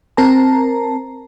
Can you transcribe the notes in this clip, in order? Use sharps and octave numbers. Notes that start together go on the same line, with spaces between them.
C4 A#4 A5 A#5